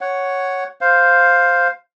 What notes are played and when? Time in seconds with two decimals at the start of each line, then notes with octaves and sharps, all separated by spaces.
0.01 C#5 F#5
0.81 C5 F5